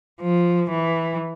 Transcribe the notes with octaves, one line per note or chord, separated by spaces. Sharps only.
F3
E3